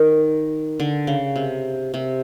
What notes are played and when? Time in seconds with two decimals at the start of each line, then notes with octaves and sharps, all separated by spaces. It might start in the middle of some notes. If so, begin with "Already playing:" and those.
Already playing: D#3
0.80 D3
1.07 C#3
1.36 C3
1.94 C3